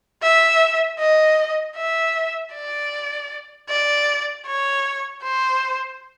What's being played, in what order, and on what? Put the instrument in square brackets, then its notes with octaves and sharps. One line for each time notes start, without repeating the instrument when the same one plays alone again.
[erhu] E5
D#5
E5
D5
D5
C#5
C5